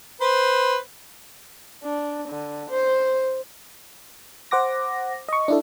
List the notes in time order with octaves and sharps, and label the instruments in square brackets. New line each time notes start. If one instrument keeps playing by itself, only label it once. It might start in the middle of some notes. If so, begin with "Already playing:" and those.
[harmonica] B4 C5
[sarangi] D4
D3
C5
[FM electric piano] C5 F#5 D6 A#6
D#5 C#6
D4 E4 A4